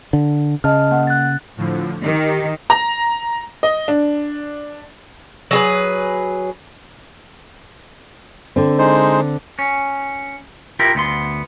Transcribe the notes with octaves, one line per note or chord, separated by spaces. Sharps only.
D3
C#3 D#5 A5 F6
A#3 F#5
F#6 A6
A2 D3 F3
D#3 G4
A#5
D#5
D4
F#3 G#4 B4
D3 C4
G#3 D#4 C5
C#4
E4 F4 G4 A#4
D2 B3 C6